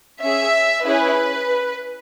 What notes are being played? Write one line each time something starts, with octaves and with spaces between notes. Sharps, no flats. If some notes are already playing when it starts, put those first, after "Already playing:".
C#4 G#4 E5
C#4 E4 G#4 B4